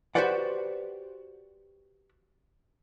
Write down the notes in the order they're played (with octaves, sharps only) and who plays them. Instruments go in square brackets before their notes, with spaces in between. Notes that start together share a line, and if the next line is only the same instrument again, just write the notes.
[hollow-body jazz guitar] F#4 G4 B4 C5 D5 F#5